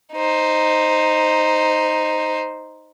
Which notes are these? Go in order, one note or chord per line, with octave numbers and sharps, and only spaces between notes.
D#4 C5